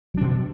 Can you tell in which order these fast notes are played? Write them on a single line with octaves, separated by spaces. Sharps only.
F#3 D4 B2